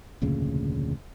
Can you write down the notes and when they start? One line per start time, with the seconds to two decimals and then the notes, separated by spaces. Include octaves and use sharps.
0.22 F1 D2 A#2 C#3